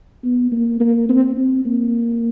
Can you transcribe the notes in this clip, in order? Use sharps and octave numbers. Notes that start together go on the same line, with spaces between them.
B3
A#3
A#3
C4
C4
A#3